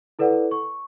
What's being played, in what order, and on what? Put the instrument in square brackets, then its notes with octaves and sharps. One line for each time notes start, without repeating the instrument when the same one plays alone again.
[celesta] E4 A4 B4 D5 F#5
C#6